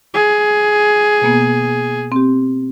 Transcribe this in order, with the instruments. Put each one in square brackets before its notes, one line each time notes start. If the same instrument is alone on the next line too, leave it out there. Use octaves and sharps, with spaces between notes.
[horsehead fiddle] G#4
[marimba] B2 A#3 B3
C4 G4